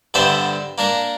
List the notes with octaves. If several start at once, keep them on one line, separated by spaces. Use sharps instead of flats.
G2 D3 B3 C5 D5 E5
A#3 D4 A#4